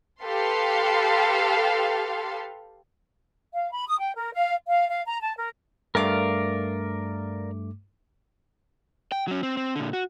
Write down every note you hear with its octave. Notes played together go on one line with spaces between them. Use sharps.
G4 A4 B4 F5 C6
F5
B5
D#6
G5
A#4
F5
F5
F5
A#5
A5
A#4
G2 A3 A#4 D5 F5 D6
G5
F#3 C#4
C4
C4
A#2 D3
F#4